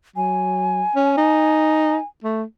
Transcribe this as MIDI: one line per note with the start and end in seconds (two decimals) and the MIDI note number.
0.16 0.83 54
0.16 2.05 80
0.95 1.16 61
1.17 1.97 63
2.24 2.43 57